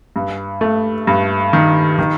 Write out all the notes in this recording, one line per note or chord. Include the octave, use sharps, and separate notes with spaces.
G2
A3
G2
D#3
D#3